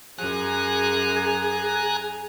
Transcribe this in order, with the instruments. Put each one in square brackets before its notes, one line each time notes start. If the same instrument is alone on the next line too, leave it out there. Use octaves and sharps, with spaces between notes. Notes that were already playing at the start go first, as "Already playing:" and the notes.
[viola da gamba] F#2 [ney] G#4 [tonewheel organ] G#5 A#5 F#6